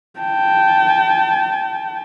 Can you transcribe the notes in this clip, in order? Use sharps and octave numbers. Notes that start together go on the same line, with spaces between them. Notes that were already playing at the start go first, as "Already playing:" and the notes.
G5 A5